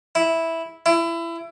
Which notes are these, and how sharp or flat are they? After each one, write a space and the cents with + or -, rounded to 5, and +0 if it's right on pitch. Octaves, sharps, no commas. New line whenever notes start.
E4 -5
E4 +25